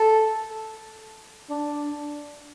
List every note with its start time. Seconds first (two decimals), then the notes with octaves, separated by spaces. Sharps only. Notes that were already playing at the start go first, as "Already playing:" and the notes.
Already playing: A4
1.50 D4